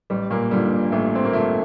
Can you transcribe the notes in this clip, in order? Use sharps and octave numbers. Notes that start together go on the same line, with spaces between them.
A1 G3
A#2 A#3
G2 D3 F3 G3
A1 A3
C4
A#3
G2 D3 F3 A3